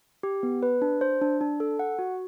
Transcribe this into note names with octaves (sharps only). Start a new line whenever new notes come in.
G4
B3
B4
D4
C5
D4
D4
A4
F#5
F#4